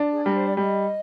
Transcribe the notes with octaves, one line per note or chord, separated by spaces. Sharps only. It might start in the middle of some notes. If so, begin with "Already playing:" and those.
Already playing: D4 D5
G#4
G3 A#4
C5
D5
G3 D#5